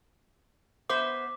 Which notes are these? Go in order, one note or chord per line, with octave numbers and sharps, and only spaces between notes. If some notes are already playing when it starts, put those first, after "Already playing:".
B3 C5 E5 D6